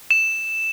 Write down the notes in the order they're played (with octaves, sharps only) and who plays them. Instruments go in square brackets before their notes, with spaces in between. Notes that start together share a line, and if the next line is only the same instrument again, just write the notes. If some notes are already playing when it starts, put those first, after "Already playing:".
[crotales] E7